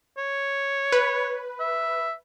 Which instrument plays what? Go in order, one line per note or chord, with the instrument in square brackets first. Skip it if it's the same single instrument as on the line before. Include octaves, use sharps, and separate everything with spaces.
[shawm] C#5
[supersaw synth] B4
[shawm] E5